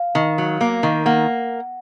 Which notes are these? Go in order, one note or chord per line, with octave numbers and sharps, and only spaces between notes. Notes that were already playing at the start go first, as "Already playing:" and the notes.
Already playing: F5
D#3
F#3
A#3
D#3
A#3 F#5